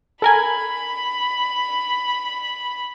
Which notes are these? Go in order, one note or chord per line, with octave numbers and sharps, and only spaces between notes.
A4 A#4 G#5 B5